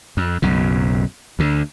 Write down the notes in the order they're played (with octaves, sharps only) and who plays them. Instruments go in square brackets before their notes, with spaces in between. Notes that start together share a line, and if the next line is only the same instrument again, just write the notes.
[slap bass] F2
B1 F#2 C#3
D2 D3